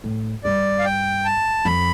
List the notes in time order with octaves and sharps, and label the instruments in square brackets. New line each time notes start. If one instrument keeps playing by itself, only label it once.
[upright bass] A2
[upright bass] G2 [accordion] D5
[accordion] F5
G5
A5
[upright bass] F2 [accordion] B5